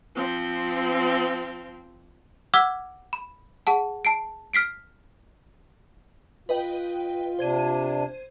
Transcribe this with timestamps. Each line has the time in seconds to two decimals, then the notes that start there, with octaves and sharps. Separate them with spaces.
0.15 F3 C4
2.54 F#5 D6 E6 F6 G#6 B6
3.13 B5
3.67 G#4 F#5 A5
4.05 A5 C7 D7
4.53 F6 B6 C7 D7
6.49 F4 B4 D#5 G5
7.39 C3 D4 C5 G#6 D#7